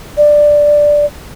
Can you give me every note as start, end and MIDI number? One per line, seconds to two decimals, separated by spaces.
0.17 1.05 74